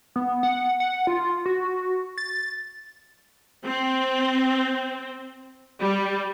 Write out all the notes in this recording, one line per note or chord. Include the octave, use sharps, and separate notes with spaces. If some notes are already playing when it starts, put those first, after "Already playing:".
B3
F#5
F#5
F4
F#4
A6
C4
G3